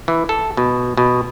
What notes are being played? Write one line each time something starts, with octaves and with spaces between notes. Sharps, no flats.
E3
A4
B2
B2